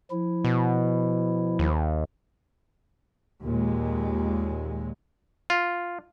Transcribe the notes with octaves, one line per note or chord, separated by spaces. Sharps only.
F3 E4
B2
D#2
D#2 A#2 G#3
F4